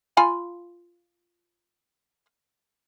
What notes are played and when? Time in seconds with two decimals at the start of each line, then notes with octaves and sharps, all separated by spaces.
0.17 F4 G#5 B5